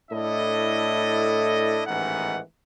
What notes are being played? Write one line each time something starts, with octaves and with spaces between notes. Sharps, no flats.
A2 D4 E4 A4 D#5
A1 G#2 D#3 E3 B3 F#5